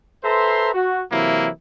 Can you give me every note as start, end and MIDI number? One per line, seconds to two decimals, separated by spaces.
0.23 0.70 69
0.23 0.70 71
0.23 0.70 72
0.23 0.70 76
0.23 0.70 82
0.23 0.70 84
0.73 1.02 66
1.11 1.48 48
1.11 1.48 52
1.11 1.48 54
1.11 1.48 58
1.11 1.48 64